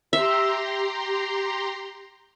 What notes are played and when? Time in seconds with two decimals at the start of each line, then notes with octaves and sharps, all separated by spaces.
0.13 G4 E5 A#5 C6